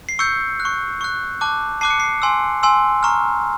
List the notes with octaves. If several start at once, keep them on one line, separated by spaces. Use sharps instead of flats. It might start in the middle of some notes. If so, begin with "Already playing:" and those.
C7
C#6 E6 G6 C#7
F#6
C#6
C#6 F#6
A5 D6 F#6
A5 D6 F#6 C7
C#7
C7
G#5 C6 E6
G#5 C6 E6
A#5 C#6 F6